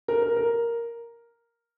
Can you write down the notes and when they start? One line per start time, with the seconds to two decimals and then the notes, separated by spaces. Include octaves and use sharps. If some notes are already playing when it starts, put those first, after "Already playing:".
0.08 A#4
0.22 A#4
0.36 A#4